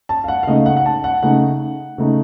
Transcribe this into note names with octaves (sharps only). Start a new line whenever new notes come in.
A5
F5
F#5
F5
C#3 A3 D#4 D#5
F#5
F#5
A5
F#5
C#3 A3 D#4 F#5
C#3 A3 D#4